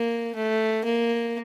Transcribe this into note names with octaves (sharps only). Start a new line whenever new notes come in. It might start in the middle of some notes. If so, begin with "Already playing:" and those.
Already playing: A#3
A3
A#3